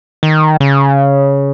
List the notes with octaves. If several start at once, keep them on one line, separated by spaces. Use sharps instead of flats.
D#3
C#3